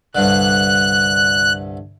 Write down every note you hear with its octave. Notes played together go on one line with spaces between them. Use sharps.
C2 G2 D3 F#6